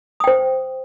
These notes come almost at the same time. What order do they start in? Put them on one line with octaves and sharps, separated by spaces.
D#6 G5 C5